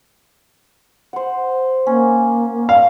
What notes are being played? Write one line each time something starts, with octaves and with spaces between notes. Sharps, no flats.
C5 F#5
A#3 C#4
F5